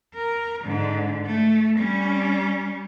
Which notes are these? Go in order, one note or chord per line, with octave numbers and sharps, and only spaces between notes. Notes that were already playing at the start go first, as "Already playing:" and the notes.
A#4
G#2 D3
A3
G3 C#4